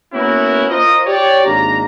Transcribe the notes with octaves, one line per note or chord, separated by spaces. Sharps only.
A#3 B3 C#4 E4 F#4 A#4
F4 A#4 C5 D#5
G4 C#5 D5
G#1 A#3 D4 A#5